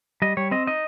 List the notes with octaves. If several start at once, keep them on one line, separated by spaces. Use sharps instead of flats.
G3 D#5
G3 C#5
C4 D#5
D#4 D#5